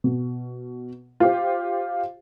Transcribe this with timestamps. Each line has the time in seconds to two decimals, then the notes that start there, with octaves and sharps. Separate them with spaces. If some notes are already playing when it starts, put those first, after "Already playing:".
0.04 B2
1.20 F4 G4 C5